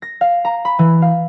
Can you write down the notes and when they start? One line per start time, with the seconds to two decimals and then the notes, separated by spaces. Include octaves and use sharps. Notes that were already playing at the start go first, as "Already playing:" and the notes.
0.02 A#6
0.21 F5
0.45 A#5
0.65 B5
0.79 E3
1.02 F5